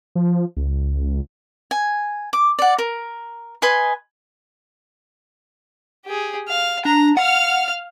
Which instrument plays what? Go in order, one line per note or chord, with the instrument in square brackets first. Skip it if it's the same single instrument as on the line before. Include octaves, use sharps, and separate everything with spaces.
[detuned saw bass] F3
C#2
[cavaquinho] G#5
D6
D5 F#5
A#4
B4 D#5 G#5 C6
[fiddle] G4 G#4
F5
[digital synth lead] D4 [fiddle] A#5
[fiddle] F5 F6 [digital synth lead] F#5